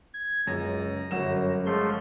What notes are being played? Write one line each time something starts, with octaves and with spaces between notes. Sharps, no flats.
G#6
C#2 F#2 A#6
G1 F#2 F#3 E7
F3 G#3 A3 C6